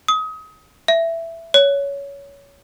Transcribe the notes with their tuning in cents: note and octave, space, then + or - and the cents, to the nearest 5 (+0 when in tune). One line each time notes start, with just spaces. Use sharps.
D#6 +30
E5 +10
C#5 +15